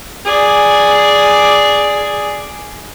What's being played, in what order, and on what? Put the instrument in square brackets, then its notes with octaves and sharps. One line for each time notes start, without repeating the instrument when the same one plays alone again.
[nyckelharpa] G#4 D5